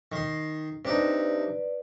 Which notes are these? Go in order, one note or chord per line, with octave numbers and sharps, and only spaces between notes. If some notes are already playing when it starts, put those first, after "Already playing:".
D#3 C6
C3 D4 D#4 B4 D5